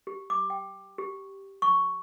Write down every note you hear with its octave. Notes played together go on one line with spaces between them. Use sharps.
G4
D6
G5
G4
C#6